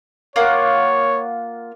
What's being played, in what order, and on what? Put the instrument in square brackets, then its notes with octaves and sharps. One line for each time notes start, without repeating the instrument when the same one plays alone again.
[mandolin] A#3 F4 F#5 [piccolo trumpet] C#5